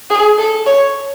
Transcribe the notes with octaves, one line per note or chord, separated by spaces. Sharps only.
G#4
A4
C#5